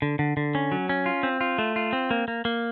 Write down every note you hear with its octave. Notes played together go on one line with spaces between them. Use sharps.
D3
D3
D3
C#4
F#3
C#4
F4
C4
F4
A3
F4
C4
A#3
A#3
A#3